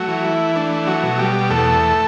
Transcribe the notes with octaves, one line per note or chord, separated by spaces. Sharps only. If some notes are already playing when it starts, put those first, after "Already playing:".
Already playing: F#3 A3 F#4
E3
E4
A3 D4
F#3 F#4
B2
G3 G4
E2 A3 A4